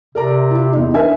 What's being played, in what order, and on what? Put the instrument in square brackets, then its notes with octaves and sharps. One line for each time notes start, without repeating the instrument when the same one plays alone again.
[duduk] C3 [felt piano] A#4 D5 A#5
[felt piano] E4 F4
E2 E3 D#4
[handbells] D4 A#4 B4 [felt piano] E5 G#5